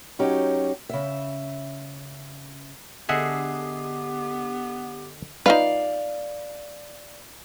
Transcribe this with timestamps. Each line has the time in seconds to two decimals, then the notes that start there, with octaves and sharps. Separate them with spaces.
0.19 F#3 C#4 D#4 G4
0.89 C#3 E5
3.09 D3 B3 G4 G#4 D#5 E5 F#5 C7
5.46 D#4 F4 B4 D5 F5